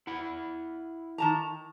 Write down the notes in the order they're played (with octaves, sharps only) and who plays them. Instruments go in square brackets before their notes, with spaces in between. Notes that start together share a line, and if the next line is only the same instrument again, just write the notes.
[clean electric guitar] E4 F#5 B5
[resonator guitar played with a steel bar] D#3 A5 A#5